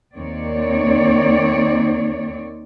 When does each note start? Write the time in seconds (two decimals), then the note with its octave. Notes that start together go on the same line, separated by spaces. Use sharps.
0.16 D#2 D#3 C4 C#5 D5